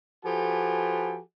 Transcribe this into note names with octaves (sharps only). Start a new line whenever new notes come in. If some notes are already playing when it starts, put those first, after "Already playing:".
F3 F#4 G4 A4 B4 G#5